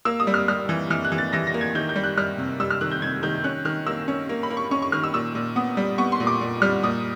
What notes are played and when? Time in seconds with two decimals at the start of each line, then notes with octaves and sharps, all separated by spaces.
0.05 A#3 E6
0.20 D#6
0.27 G3
0.34 F6
0.48 G3 F6
0.69 E3
0.90 E3 F6
1.05 F#6
1.12 E3
1.18 A6
1.33 E3 A#6
1.47 A#6
1.54 A#3
1.61 G#6
1.75 D#3 G6
1.89 G6
1.96 G3
2.04 F#6
2.17 G3 F6
2.38 C3
2.60 G3 E6
2.70 F6
2.81 D#3 F#6
2.91 G6
3.02 C3 G#6
3.23 D#3 G6
3.44 C#4 F#6
3.65 D#3 F6
3.87 A#3 E6
4.08 C#4
4.29 A#3
4.43 B5
4.50 A#3
4.57 C#6
4.71 C#4 C#6
4.82 C#6
4.92 D#3 F6
5.03 E6
5.14 A#2 E6
5.35 A#2
5.56 B3 D#6
5.77 G3
5.98 B3 C#6
6.12 C6
6.20 A#2
6.27 D6
6.41 A#2
6.62 G3 F6
6.83 A#2 D#6